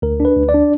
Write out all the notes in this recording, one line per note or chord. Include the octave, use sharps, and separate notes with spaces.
D2 A#4
D4
B4
D2
D5
D4